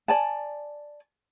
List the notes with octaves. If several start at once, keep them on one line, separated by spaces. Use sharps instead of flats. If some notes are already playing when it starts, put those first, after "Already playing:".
D5 G#5 A5